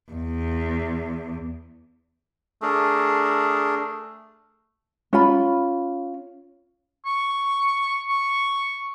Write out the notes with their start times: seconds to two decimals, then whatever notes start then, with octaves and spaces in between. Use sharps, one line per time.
0.12 E2
2.62 A3 D4 G#4 A#4
5.13 C#4 F4 B5
7.06 C#6
8.09 C#6